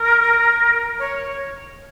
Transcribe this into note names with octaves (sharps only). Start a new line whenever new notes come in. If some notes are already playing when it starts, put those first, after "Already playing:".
Already playing: A#4
C#5